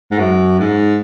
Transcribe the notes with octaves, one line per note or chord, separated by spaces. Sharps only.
G#2
F#2
G#2